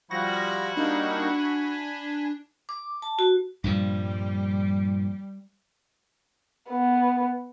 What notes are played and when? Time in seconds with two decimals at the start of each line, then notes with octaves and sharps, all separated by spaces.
0.11 F3 G3 E4 F#4 A#6
0.77 G3 A#3 D4 D#4
1.37 G#5 B5
2.69 D6
3.02 A5
3.19 F#4
3.64 G2 A#2 F3 G3
6.70 B3